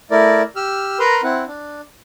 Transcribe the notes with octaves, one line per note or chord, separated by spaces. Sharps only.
A3 E4 A#4 D5
G4 E6 F6
A#4 B4 A#5 C6
C4 E4 F#5
D4